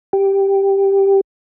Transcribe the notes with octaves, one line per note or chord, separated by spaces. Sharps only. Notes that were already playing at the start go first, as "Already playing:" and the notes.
G4